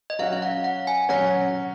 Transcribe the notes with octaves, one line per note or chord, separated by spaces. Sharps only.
D#5
F#3 C#4 F#4 F5
F5
F#5
F#5
G#5
F#3 C#4 F#4 F#5